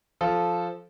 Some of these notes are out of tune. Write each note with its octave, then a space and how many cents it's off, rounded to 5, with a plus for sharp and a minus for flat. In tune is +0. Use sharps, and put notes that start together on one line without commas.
F3 +0 F4 +0 A4 -10